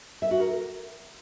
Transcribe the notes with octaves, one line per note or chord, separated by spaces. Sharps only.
E5
F#4
A#4